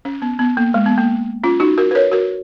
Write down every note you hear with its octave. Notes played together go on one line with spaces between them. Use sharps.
C#4
B3
B3
A#3
G#3
B3
A#3
C#4 F4
D#4 F#4
F#4 A#4
B4
A#4 C#5
F#4 A#4